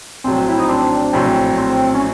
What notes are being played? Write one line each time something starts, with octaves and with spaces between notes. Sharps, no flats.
A#1 A2 F#3 C4
E4
D#4
C4 D4
A#1 A2 F#3 C4
C4
C#4